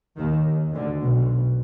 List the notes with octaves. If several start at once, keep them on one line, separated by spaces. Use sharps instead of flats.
D#2 D#3
D2 D3
B1 B2